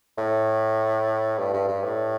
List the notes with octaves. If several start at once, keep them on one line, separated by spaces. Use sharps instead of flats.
A2
G2
G2
G2
A2